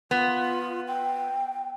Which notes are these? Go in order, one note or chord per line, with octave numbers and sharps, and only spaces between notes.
B3 F4
G5